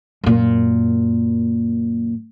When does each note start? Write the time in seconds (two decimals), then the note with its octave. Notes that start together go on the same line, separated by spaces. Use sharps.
0.24 F#2 A#2